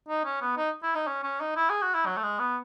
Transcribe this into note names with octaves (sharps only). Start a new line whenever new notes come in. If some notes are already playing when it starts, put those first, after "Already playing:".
D#4
C#4
B3
D#4
E4
D#4
C#4
C#4
D#4
E4
G#4
F#4
E4
F#3
A3
G#3
B3